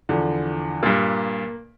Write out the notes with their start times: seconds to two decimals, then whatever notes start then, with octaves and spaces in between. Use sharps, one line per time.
0.09 E2 D3 F3
0.83 G2 A#2 A#3